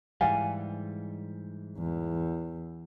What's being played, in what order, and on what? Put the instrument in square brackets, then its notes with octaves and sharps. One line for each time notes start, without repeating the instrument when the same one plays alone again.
[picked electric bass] G#2 E3 G3 [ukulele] D5 F5 G#5
[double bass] E2